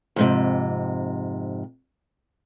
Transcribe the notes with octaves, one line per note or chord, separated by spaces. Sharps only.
F2 G#2 C3